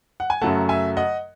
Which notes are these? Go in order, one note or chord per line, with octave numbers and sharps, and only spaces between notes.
F#5
G#5
F#2 C#3 F#3 A3 F#5 A5
E5 G#5
D#5 F#5